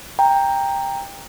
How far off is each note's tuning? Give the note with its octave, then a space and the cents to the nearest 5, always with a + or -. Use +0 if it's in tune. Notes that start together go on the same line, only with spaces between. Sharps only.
G5 +15 A#5 +0